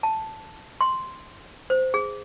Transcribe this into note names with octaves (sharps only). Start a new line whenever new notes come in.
A5
C6
C5
G#4